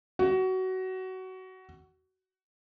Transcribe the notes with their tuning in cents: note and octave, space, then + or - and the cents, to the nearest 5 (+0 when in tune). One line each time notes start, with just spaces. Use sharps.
F#4 +20